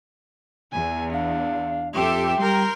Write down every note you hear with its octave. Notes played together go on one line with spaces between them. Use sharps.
E2 G#5
D4 F5
F2 G4 A4 E5 G5 C6
G3 A#4 C6 G6